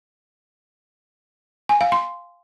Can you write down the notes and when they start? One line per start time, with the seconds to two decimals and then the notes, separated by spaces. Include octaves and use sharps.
1.69 G#5
1.81 F5
1.92 C6